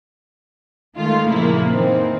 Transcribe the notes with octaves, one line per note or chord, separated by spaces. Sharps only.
D#3 G#3 A3 F4
F#2 A#2 C#3 F3 A#3 E4
D#3 E3 A#3 C4